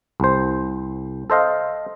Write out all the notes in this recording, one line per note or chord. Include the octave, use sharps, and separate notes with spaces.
C2 C5
A4 C5 D#5 F5